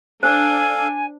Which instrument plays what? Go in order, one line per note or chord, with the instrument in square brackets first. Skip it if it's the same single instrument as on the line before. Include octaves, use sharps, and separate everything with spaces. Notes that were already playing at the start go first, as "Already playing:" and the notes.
[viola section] D4 [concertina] A4 F5 [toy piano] C5 [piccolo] G#5